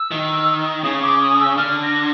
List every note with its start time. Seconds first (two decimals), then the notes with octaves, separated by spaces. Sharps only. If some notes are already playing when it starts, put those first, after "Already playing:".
Already playing: E6
0.11 D#3
0.84 C#3 D#6
1.02 D6
1.21 D#6
1.39 E6
1.57 D3 F6
1.83 A#6